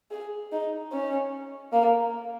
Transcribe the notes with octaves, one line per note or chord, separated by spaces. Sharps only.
G#4
D#4
C#4
A#3